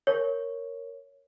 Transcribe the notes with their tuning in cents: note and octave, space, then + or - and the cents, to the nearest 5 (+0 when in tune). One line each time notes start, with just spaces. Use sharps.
A#4 +0 C#5 +0